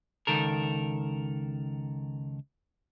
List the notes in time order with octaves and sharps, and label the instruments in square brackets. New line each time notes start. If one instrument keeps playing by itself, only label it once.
[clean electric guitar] C#2 D#3 A4 A#4